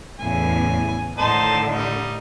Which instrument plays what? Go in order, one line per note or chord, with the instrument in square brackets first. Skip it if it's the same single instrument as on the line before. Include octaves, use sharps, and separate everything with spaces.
[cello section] E2 A2 C#3 [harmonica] G#5
[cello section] A2 D3 D#3 [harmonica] D#4 C5 A5
[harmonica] G3 D#4